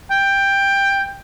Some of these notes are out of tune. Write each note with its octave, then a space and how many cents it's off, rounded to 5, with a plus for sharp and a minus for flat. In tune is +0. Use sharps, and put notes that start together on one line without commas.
G5 +10